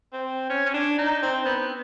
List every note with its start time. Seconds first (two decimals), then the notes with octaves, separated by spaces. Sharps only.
0.13 C4
0.50 C#4
0.66 C#4
0.74 D4
0.98 D#4
1.23 C4
1.46 B3